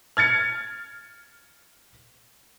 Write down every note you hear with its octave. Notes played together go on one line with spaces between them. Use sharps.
F6 G#6 A6 C#7